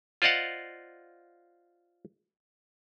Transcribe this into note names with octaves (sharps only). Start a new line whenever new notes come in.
F4 C5 D5 D#5 F5 F#5